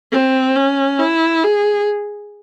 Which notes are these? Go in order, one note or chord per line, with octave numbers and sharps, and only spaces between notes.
C4
C#4
E4
G#4